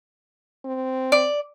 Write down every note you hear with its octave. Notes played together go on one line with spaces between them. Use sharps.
C4
D5